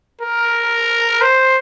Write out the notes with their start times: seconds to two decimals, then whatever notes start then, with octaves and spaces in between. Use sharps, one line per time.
0.21 A#4
1.21 C5